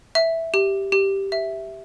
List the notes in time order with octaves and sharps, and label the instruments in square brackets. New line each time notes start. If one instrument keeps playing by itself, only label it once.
[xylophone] E5
G4
G4
E5